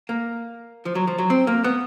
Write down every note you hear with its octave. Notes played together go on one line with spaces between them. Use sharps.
A#3
F3
F#3
F3
F#3
C4
A#3
B3